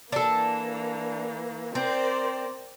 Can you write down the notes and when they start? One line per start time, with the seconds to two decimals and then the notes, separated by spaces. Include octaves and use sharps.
0.12 E3 A#3 D4 A4
1.75 C4 A#4 C5 D5